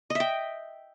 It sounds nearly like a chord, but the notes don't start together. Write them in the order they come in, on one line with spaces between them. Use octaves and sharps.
D#5 E5 G5